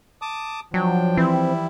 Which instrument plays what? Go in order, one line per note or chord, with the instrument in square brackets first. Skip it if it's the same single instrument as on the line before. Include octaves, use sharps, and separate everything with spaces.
[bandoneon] A5 D6 D#6
[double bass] F3 [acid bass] F#3 [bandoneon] D4 G5
[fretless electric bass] E3 [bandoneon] G3 E4 [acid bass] C4